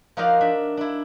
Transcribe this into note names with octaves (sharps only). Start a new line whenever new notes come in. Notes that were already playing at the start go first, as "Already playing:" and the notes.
F3 D#4 F#4 A#4 D5 F5
D4 E5
D4 E4